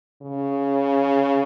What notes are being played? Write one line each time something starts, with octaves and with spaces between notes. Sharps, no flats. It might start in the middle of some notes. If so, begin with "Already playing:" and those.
C#3